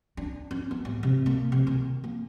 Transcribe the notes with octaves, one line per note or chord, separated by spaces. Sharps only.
D4
C#4
B3
A1
C3
A#3
C3
D#3
A#3